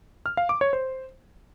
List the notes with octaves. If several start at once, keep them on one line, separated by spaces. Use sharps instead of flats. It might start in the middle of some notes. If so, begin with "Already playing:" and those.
F6
F5
D6
C#5
C5